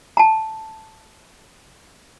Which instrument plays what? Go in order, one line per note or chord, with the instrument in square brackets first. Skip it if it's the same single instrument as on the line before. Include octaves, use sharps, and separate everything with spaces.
[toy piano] A5 A#5